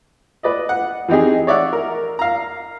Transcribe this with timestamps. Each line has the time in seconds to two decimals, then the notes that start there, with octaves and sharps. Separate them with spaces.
0.43 B4 D5 D#5
0.69 F#5
1.08 E3 C4 D#4 G4 G#4
1.47 C#5 D5 E5 F#5
1.73 A#4
2.19 F5 A#5